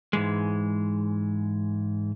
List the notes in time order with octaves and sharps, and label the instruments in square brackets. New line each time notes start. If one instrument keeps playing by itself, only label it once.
[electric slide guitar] G#2 E3 G#3